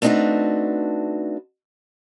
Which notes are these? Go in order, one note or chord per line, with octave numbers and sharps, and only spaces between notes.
A3 C4 D4 D#4 F#4 B4